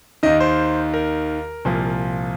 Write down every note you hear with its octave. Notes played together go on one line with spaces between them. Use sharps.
D#2 D#3 D#5
C5
A#4
C2 A#2 F3